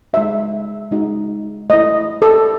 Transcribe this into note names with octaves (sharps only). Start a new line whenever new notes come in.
G#3 D#4 F#4 E5
G#3 D#4 F#4
A3 E4 D#5
A4